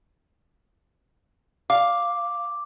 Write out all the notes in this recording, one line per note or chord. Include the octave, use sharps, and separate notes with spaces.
F5 D6